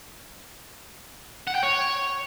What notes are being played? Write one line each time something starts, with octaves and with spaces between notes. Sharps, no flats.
F#5
G5
C#5